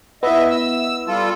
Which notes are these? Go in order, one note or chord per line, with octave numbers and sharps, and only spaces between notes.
B3 E4 D#5 E5
E6
G3 F4 A4